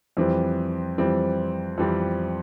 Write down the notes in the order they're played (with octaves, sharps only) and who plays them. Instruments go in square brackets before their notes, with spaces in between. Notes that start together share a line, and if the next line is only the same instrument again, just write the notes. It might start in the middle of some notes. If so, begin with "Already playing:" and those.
[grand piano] F2 E3 G3 C4
F2 E3 G3 C4
F2 E3 G3 C4